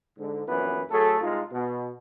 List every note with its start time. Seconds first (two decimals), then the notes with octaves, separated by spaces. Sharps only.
0.18 G#2 D3
0.47 A#1 F#2 E3 B3 B4
0.90 F#3 A3 G#4 A4
1.21 C2 G#3 D#4 F4
1.52 B2